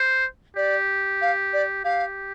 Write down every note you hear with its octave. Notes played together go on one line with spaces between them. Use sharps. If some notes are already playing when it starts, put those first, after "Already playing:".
Already playing: C5
G4 D5
F5
D5
G4 F5